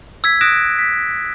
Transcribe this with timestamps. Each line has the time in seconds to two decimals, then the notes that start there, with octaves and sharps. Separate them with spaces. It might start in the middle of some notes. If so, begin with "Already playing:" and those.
0.24 E6 G#6 B6
0.41 D#6 F#6 A#6 D7 E7
0.79 B6